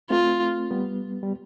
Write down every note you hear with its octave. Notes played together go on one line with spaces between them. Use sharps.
A3 C4 F4
G3 B3
G3